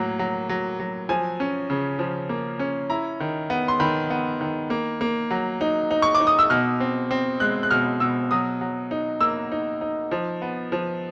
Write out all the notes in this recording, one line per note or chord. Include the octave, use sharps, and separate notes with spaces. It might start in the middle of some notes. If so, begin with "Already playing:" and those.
Already playing: A2 F#3 A#3
F#3
F#3
F#3
F3 G#5
C#4
C#3
F3
A#3
C#4
E4 A#5
D#3
B3
C6
D#3 B5
B3
D#3
A#3
A#3
F#3
D#4
D#4
C#6
D6
D#4
D#6
E6
B2 F6
C4
C4
G#3 F#6
F#6
B2 F6
B2 E6
F#3 D#6
F#3
D#4
A#3 E6
D#4
D#4
F3
B3
F3